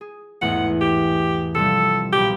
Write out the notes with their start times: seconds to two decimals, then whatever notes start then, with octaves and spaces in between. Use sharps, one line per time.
0.01 G#4
0.41 A1 E2 G#2 F#5
0.81 G4
1.55 C3 F3 G3 A4
2.13 B1 A#2 G4 B5